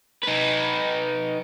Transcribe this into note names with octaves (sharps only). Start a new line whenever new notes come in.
D#4 B4